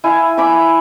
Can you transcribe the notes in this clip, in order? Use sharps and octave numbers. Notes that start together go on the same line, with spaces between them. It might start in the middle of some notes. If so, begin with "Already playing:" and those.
E4 F5 G#5
E5 G#5 B5 D6